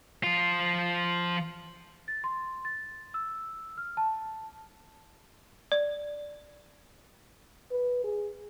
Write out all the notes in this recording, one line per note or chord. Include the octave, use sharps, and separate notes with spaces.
F3 F4
A6
C6
A6
E6
F6
A5
D5
B4
G#4